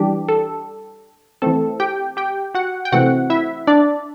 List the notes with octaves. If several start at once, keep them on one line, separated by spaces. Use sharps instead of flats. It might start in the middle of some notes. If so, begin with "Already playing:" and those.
Already playing: E3 G3 D4 G4
A4
E3 A3 C4 A4
G4 G5
G4 G5
F#4 F#5
G5
C3 E3 A3 C4 F#4 F#5
E4 E5
D4 D5